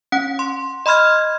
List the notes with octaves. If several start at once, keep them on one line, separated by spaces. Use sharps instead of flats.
C#4 F#5
C6
D#5 B5 C6 F6 G#6